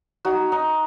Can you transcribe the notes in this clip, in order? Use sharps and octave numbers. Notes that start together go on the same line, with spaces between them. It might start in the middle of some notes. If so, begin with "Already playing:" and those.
D#4 F#4
D#4